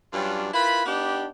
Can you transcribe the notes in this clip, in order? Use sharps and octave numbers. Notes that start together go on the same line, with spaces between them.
G2 F#3 G3 C#4 D4 F4
E4 F4 A#4 B4 B5
B3 D4 D#4 G4